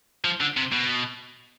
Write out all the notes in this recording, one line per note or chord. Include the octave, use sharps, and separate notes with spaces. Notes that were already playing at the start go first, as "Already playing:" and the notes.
F3
D3
C3
B2